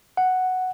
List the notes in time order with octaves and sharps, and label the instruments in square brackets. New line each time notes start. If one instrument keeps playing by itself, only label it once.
[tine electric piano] F#5